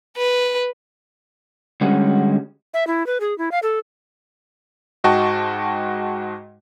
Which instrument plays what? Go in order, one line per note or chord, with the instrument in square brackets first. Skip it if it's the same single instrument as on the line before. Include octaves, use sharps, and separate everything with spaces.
[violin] B4
[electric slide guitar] D3 G3 G#3 C#4 F#4
[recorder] E5
E4
B4
G#4
E4
F5
A4
[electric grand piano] G#2 F#4 D#5 G5 A5 C#6